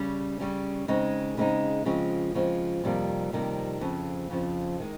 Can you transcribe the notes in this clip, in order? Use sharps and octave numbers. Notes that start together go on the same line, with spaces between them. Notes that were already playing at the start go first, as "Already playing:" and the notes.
Already playing: C#3 G3 C#4
C#3 G3 C#4
C#3 G#3 C4 D#4
C#3 G#3 C4 D#4
C#3 F3 G#3 C4
C#3 F3 G#3 C4
F2 C3 D#3 G3 A#3
F2 C3 D#3 G3 A#3
F2 C#3 F3
F2 C#3 F3
D#3 G#3